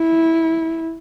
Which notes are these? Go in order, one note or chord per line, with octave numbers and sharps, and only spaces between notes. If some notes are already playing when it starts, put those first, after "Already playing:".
Already playing: E4